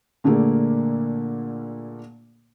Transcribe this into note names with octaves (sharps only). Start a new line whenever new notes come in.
A#2 D3 A3 A#3 D4 G#4